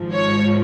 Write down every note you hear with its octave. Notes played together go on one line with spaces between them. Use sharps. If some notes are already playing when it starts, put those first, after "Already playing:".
Already playing: G#1 G#2 F3
C#5